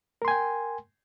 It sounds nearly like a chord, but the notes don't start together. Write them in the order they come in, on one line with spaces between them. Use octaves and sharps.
A#4 C6 G#5 G5